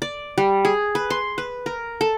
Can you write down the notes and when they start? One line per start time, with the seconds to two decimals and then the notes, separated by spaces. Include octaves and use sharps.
0.02 D5
0.38 G3
0.65 G#4
0.95 B4
1.10 C6
1.38 B4
1.66 A#4
2.01 A4